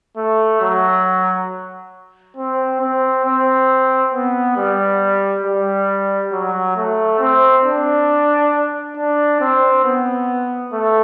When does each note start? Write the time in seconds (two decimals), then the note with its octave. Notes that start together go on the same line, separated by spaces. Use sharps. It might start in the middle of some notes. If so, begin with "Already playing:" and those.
0.17 A3
0.61 F#3
2.36 C4
2.81 C4
3.25 C4
4.13 B3
4.57 G3
5.44 G3
6.32 F#3
6.76 A3
7.20 C4
7.65 D4
8.96 D4
9.41 C4
9.84 B3
10.73 A3